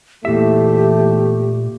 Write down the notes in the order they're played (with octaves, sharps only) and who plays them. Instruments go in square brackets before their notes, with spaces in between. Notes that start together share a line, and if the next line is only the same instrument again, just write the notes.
[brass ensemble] E2 A3 [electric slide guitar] A#2 E5 [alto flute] G4